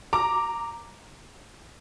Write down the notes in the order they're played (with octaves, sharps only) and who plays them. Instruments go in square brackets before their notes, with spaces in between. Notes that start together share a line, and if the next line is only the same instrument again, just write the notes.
[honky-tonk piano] A#5 D6